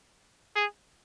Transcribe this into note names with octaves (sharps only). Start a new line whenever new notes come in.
G#4